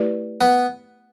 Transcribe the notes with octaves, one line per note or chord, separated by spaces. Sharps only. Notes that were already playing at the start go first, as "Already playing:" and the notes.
Already playing: A3 E4 G4 B4 D5
B3